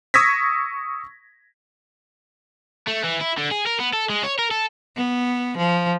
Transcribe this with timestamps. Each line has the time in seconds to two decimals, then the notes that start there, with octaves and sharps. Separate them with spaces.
0.14 C#6 D#6 E6 G#6 A#6 B6
2.87 A3
3.04 E3
3.21 E4
3.37 D3
3.51 G#4
3.67 A#4
3.80 B3
3.94 A4
4.09 G#3
4.23 C#5
4.39 A#4
4.51 A4
4.96 B3
5.57 F3